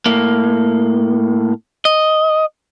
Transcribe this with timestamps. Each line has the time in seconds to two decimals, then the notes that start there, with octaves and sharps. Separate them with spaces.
0.06 A2 A#3
1.85 D#5